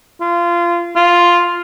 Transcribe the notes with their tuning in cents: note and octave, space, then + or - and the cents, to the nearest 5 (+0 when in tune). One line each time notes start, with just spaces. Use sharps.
F4 -20
F4 +0